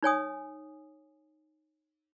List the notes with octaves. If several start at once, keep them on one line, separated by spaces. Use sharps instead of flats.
D#4 C#5 G#5 D#6